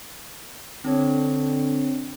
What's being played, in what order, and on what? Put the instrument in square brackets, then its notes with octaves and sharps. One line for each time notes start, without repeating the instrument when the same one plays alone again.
[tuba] D3 [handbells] C4 D4 C#5